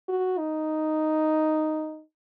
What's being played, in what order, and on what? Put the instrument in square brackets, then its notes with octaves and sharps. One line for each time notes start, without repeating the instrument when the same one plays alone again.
[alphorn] F#4
D#4